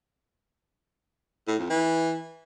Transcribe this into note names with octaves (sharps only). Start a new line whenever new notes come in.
A2
F2
E3